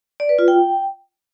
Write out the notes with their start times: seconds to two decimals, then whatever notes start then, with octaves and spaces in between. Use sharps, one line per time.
0.20 D5
0.29 B4
0.39 F4
0.48 G5